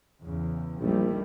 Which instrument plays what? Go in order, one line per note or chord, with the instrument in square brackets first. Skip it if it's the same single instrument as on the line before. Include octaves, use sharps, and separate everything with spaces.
[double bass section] E2 C#3
[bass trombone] A#1 [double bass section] D#3 G3 A3